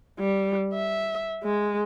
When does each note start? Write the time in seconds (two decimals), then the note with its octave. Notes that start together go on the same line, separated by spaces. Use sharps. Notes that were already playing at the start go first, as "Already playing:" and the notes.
0.20 G3
0.73 E5
1.43 G#3